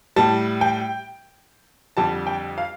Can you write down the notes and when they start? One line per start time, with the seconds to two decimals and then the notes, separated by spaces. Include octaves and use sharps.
0.16 A2 G3 A5
0.61 G5
1.97 F2 D3 G3 A5
2.27 G5
2.58 F5